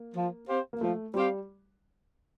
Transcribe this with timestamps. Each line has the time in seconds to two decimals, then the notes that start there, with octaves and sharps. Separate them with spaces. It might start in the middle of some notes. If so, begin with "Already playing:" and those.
Already playing: A#3
0.15 F3
0.47 C4 G4 C5 F5
0.73 A#3
0.81 F3 A3
1.14 G3 C4 G4 C5 F5